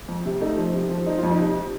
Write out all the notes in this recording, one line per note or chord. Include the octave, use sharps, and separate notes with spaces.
F2
C3
A3 D#4
F3
C3
F3
F3 D#4
F2 F4
D#4
C3